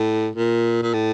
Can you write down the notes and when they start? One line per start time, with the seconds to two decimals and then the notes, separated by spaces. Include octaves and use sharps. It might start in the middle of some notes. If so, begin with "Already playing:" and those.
Already playing: A2
0.35 A#2
0.83 A#2
0.94 A2